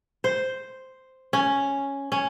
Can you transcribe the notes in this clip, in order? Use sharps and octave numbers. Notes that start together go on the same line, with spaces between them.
C5
C#4
C#4